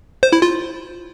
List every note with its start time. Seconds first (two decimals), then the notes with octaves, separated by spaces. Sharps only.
0.23 C5
0.32 E4
0.42 F4